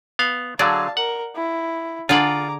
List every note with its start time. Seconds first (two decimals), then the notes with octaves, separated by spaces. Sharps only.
0.19 B3 F5
0.59 D3 F#3 G#4 D5 F5 A5
0.97 A#4 F#5
1.35 E4
2.09 D3 D4 F4 G#4 D5 A#5 D6